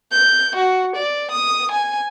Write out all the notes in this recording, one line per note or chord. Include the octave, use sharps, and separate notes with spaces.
G6
F#4
D5
D#6
G#5